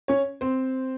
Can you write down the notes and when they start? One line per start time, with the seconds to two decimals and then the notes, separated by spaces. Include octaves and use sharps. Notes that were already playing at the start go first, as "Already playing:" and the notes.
0.08 C#4 C#5
0.41 C4 C5